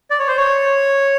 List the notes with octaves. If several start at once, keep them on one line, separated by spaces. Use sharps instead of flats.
D5
C#5
C5
C#5